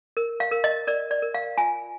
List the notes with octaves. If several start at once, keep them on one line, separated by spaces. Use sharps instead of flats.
A#4
F5
A#4
D#5
A#4 D5
D5
A#4
F5
F4 G#5